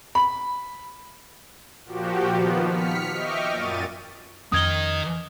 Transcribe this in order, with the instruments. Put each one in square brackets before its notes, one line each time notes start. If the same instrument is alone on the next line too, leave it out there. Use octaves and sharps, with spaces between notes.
[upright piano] B5
[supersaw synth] A#2 F3 F#4 G4
D#3 F3 B3
F6 B6 C#7
D#5 E5 G5 C#6 D6 F6
F#2 A#2 A6 D#7
[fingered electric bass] F2 C#4 [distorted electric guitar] D#3 D#5 [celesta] D#6 G#6 G7